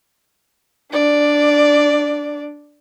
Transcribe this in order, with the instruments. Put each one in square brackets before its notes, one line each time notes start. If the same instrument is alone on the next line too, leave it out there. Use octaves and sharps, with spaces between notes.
[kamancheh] D4 D5